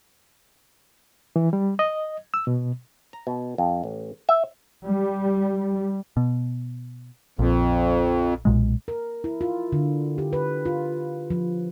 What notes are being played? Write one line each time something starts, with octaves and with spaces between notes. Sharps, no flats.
E3
G3
D#5
E6
B2
A#5
B2
F2
A1
E5
G3
B2
A#1 F2
B1 A#2 G#3
A#4
E4
F4
D3
G4
B4
F4
F3